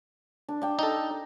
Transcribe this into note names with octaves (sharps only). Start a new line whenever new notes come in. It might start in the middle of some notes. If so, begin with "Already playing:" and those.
D4
D4 G5
D#4 A4 D#5